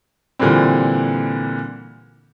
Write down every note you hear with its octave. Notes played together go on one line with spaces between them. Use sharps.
A#2 D3 E3 G3 C4